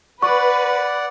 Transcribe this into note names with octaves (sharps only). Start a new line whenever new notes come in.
B4 D5 F#5 C#6